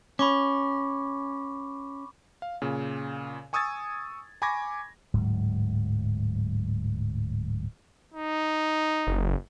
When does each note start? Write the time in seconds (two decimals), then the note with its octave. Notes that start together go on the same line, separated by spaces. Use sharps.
0.19 C#4 B5 C#6 D6
2.42 F5
2.62 A#2 C#3
3.53 G#5 C#6 D#6 E6 G#6 A6
4.42 G#5 B5 C#6 D6 G#6 A#6
5.14 D1 G#2 F#3
8.14 D#4
9.07 F#1